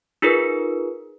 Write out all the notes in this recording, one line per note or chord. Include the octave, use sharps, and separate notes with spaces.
D#4 F4 G#4 A#4 B4